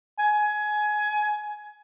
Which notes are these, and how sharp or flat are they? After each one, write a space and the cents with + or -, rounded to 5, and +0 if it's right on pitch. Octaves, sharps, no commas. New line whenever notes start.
G#5 +20